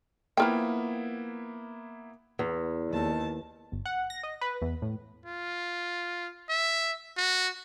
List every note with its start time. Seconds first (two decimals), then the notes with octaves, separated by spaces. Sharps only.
0.37 F3 A#3 B3 E4 A#4 G5
2.39 E2
2.88 D#2 A5
3.72 G1
3.85 F#5
4.10 A#6
4.23 D#5
4.41 B4
4.62 E2
4.82 A2
5.26 F4
6.49 E5
7.17 F#4